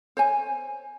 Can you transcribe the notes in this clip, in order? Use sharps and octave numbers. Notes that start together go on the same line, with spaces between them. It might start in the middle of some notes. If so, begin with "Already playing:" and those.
C5 C#5 G#5